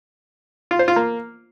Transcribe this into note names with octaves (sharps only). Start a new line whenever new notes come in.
F4
C5
F4
A#3